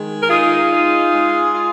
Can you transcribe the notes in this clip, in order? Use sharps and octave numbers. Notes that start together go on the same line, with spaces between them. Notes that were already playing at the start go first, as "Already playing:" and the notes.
Already playing: D#3 G#3
A#4
D#4 F4 G#4
D#4
G#3
F4